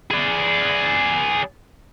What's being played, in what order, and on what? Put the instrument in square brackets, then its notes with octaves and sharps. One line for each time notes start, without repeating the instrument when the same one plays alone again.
[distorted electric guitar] G#4 D5